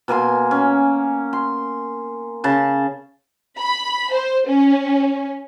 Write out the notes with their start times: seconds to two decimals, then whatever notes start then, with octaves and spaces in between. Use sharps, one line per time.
0.08 B2 A#3 G#5 C6
0.51 C#4
1.33 C6
2.44 C#3 A5
3.59 B5
4.14 C5
4.48 C#4